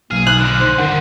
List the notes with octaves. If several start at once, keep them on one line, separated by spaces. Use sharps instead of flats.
B1 A#3 G#4 F6
D#4 F#6
A#2 D3
C5
G2 D3 D#3 F3 F#5